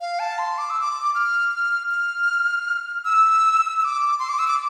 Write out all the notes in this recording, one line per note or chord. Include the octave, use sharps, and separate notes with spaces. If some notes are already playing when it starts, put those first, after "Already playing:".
F5
A5
C6
D6
E6
D6
F6
F6
E6
E6
D6
C6
D6
E6
D6